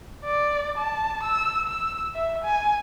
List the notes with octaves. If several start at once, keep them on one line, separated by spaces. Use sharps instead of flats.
D5
A5
E6
E6
E5
G#5